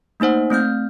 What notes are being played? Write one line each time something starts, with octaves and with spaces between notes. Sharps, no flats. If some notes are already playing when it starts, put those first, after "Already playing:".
A3 A#3 D#4 C5 F#5
A3 C4 F6 G6